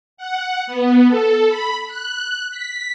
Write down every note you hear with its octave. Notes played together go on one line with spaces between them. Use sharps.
F#5
B3
A4
B5
F#6
B6